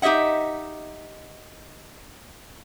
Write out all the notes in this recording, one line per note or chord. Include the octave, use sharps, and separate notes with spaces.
D#4 G4 D#5 E5 F#5